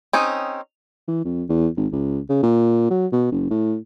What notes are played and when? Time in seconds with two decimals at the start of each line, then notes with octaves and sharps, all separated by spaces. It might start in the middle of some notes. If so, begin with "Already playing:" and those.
0.13 C4 C#4 D#4 G#4
1.08 E3
1.24 F2
1.49 E2
1.77 G#1
1.92 C#2
2.29 C#3
2.43 A#2
2.90 F#3
3.12 B2
3.32 F#1
3.50 A2